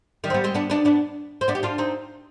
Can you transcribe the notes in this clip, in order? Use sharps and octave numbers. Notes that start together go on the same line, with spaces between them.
D#3 G3
C4
G3 B3
G#3 C4
B3 D4
B3 D4
B3 D4
C4
B3 D4
G4
D4 F4
C4 D#4